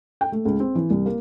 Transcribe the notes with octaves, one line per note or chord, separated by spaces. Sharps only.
G5
A3
C#2
C4
E3
C2
A#3